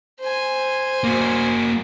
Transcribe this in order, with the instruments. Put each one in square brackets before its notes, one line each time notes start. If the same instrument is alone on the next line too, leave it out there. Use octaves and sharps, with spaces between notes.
[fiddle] C5 G#5
[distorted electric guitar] A#3 F#4